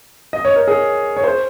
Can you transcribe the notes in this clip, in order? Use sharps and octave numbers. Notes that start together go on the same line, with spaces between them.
D#5
C#5
A#4
G#4
C#5
C5